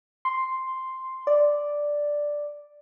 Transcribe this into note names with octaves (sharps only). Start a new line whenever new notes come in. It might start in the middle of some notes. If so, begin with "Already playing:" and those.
C6
D5